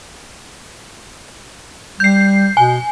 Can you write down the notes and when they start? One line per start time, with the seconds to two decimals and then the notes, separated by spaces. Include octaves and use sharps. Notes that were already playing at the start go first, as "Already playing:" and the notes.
2.00 G3 G6 C7
2.57 B2 G#5